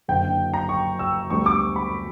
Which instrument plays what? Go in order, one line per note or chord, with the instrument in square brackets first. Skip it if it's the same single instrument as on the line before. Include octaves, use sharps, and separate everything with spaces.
[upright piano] F#1 F#2 D3 G5
A#5
C#6
E6
D2 D3 G3 B3 C#6
D6
B5